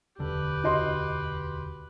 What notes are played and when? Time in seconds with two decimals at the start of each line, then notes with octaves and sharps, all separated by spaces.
0.19 E1 D2 D3 G4 B4
0.64 F#4 D#5 C6